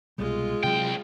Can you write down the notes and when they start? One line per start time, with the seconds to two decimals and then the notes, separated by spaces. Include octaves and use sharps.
0.18 C2 B2 G3 G#3 F4
0.64 C2 C3 F#3 G5